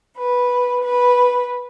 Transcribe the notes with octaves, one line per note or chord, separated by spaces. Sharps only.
B4
B4